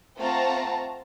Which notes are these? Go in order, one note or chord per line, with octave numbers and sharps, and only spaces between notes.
A3 C4 F4 F#5 A5 A#5